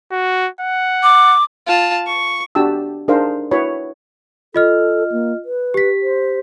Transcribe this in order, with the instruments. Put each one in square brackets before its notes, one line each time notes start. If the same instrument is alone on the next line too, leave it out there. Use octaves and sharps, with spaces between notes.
[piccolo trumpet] F#4
F#5
[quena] D6
[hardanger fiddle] F4 A5
C#6
[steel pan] D4 F#4 G4 G5 A5 E6
D4 D#4 G#4 A#4 C5 F5
E4 F#4 B4 C#5 B5
[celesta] F4 D#5 F6 [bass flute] A4
[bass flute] A#3
B4
[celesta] G4 B6
[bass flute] C5